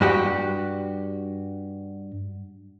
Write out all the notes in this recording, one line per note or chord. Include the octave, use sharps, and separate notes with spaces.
G2 F#4 G4